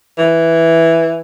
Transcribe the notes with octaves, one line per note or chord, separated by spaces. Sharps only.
E3